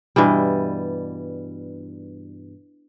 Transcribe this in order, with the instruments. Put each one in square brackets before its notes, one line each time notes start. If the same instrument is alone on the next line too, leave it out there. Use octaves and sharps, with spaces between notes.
[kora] G2 B2 E3 G3